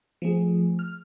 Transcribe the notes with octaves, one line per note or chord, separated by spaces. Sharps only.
F3 A3 G#4
F6